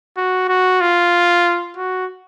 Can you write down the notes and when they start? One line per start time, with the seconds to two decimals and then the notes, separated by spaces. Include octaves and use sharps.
0.17 F#4
0.49 F#4
0.81 F4
1.77 F#4